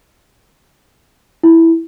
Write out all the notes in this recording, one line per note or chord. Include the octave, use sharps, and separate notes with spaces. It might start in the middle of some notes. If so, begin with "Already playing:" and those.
E4